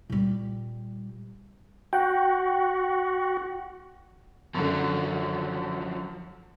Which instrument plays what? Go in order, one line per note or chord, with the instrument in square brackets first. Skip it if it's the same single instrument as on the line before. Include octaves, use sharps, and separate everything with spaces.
[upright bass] A#2 G3
[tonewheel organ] F#4 [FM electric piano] F#5 G5
[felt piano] F#2 D3 [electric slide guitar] F3 F#3